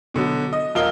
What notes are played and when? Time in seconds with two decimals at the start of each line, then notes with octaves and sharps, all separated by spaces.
0.14 B2 D3 F#3
0.53 D#5
0.75 D#1 F4 A#4 D#5 G7